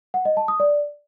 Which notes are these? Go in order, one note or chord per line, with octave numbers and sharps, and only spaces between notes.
F#5
D#5
A5
D#6
D5